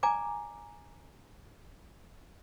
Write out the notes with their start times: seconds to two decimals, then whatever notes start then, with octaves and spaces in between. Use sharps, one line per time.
0.03 D5 G#5 A#5 D6